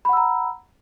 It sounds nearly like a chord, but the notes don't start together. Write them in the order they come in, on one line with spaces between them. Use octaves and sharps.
B5 F#5 E6 A#5